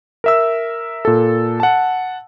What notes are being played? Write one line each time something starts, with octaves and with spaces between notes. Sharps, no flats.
A#4 E5 E6
A#2 A4
F#5 A5